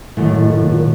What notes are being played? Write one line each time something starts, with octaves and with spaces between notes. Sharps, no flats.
G#1 F#2 A2 D#3
A#2